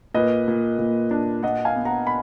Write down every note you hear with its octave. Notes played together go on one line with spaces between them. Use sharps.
A#2 B4 D#5
A#2
A#2
D4
A#2 D#5 F#5
F5 G#5
B3
F#5 A#5
B5